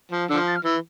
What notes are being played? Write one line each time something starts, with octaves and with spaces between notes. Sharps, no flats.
F3
D3 F3 E6
F6
A6
F6
E3 E6